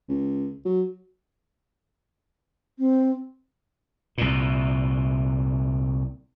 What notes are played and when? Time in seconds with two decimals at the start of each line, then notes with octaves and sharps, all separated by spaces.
0.08 C#2
0.65 F#3
2.78 C4
4.18 C2 A#2